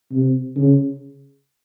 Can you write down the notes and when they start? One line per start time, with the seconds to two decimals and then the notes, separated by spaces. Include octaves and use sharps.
0.12 C3
0.57 C#3